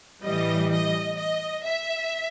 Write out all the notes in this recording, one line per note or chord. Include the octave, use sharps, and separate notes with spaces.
A2 E3 G3 D#5
D#5
D#5
E5